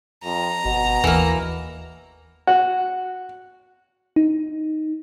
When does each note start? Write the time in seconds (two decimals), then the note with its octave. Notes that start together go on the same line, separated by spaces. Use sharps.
0.24 F2 A#5
0.65 G1 B2
1.04 D#2 E3 A#3
2.47 F#4
4.16 D#4